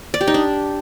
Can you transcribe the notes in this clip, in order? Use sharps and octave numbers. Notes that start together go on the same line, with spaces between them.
D5
G4
D#4
D4